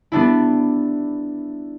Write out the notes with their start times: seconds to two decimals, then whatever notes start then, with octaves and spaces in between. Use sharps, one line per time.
0.12 G3 B3 D4 E4